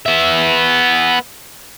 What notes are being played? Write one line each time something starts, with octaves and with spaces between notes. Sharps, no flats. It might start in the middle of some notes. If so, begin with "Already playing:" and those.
B3 E5